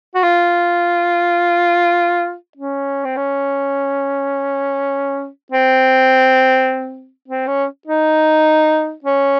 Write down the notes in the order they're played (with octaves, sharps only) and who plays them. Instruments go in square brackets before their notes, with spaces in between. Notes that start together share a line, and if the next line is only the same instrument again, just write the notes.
[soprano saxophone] F#4
F4
C#4
C4
C#4
C4
C4
C#4
D#4
C#4